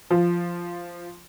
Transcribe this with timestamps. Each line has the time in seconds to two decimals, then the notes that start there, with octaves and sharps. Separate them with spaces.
0.11 F3